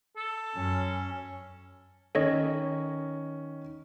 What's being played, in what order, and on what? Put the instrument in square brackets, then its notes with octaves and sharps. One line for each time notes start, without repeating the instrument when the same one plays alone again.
[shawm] A4
[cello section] F#2 [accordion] C#4
[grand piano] D#3 C#4 [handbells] A4 C#5 D#5